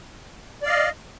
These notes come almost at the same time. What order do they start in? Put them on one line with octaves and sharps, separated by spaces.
D5 F5 D#5